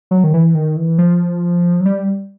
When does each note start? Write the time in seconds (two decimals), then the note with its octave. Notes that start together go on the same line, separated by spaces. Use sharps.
0.11 F#3
0.24 D#3
0.34 E3
0.55 D#3
0.76 E3
0.98 F3
1.80 F#3
1.86 G3